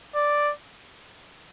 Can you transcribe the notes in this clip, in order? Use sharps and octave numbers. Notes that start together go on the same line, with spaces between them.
D5